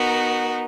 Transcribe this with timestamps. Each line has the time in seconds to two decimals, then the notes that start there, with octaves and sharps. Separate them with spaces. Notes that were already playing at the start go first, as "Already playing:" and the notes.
Already playing: B3 D#4 F#4 A#4